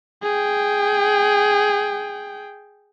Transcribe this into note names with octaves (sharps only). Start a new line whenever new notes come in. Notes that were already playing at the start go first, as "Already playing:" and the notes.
G#4 G5